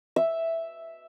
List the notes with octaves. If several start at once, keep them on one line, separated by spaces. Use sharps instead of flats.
E5